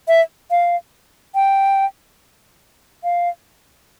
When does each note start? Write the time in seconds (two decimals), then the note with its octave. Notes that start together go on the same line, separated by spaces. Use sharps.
0.08 E5
0.51 F5
1.35 G5
3.04 F5